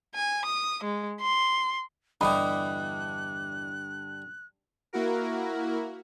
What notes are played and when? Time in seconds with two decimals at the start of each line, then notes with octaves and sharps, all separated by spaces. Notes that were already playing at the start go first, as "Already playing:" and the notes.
0.15 G#5
0.45 D#6
0.84 G#3
1.20 C6
2.21 E2 G2 D3 G3 D#5 B5 F#6
4.93 A#3 E4 F#4 A#4